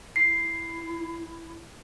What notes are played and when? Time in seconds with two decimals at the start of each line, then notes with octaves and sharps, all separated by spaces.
0.16 E4 C7